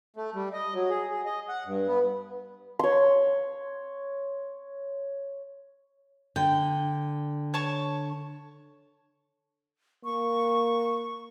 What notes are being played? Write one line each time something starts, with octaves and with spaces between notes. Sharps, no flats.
A3
G3
D#5
F#3
G#4
G#4
D#5
F#5
G2
B3
C#5 C6
D3 G5
C#5 A5 C#6
A#3 C#6